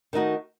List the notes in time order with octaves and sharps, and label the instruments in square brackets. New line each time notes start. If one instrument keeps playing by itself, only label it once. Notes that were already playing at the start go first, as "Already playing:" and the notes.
[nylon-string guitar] D#3 A3 D#4 F#4